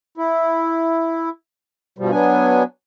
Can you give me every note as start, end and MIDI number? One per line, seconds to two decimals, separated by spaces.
0.18 1.29 64
1.98 2.11 43
1.98 2.11 47
1.98 2.11 53
1.98 2.11 55
2.11 2.63 54
2.11 2.63 59
2.11 2.63 62
2.11 2.63 80